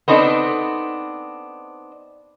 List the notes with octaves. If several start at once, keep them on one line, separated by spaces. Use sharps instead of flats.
B3 C4 D4 D#4 A4